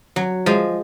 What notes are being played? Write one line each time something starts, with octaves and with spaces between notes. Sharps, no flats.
F#3
F3 G#3